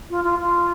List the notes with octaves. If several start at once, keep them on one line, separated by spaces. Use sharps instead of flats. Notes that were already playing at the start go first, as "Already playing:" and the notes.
F4
F4
F4